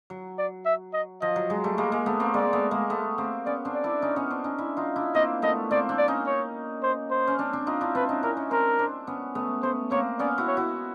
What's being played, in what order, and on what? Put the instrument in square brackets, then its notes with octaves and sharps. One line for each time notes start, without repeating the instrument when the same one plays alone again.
[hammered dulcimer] F#3
[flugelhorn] D5
E5
D#5
[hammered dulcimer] F3 [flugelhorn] D#5
[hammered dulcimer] F#3
F#3 G#3
G3 A3
G#3 A#3
G#3 A#3
A3 B3
A#3 C4
[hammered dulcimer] G#3 A#3 [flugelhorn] D5
[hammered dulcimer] A3 B3
G#3 A#3
A3 B3
A#3 C4
[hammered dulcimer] B3 C#4 [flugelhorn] D5
[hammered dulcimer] C4 D4
[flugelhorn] D5
[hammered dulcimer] D4 E4
C#4 D#4
B3 C#4
C4 D4
C#4 D#4
D4 E4
D#4 F4
D4 E4
[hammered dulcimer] A#3 C4 [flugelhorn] D#5
[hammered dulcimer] A3 B3 [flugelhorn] D#5
[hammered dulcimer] A#3 C4 [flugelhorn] D5
[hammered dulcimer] C4 D4
[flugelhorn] D5
[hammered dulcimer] C#4 D#4
[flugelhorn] C#5
C5
C5
[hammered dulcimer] C#4
C4 D4
C4 D4
D#4 F4
D4 E4
[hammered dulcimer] C4 D4 [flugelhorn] B4
[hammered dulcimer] C#4 D#4
[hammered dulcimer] D4 E4 [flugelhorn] A#4
[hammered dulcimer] C#4 D#4
[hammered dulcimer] C4 D4 [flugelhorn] A#4
[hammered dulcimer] C4 D4
B3 C#4
A3 B3
[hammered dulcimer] A3 B3 [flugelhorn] C5
[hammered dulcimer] A#3 C4 [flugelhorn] C#5
[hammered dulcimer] B3 C#4 [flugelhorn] D5
[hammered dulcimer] E4 F#4
[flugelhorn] C#5
[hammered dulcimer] E4 F#4